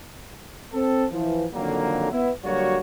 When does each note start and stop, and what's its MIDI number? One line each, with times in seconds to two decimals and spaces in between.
0.74 1.06 60
0.74 1.06 69
1.13 1.45 52
1.13 1.45 53
1.53 2.08 41
1.53 2.08 50
1.53 2.08 51
1.53 2.08 54
1.53 2.08 58
2.12 2.32 59
2.12 2.32 64
2.45 2.80 50
2.45 2.80 54
2.45 2.80 55
2.45 2.80 58
2.45 2.80 66
2.45 2.80 73